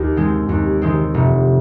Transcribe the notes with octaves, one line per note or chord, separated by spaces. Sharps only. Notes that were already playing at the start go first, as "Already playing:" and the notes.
Already playing: D#2
D#3 G#3 C4
D#2
D#3 G#3 C4
F1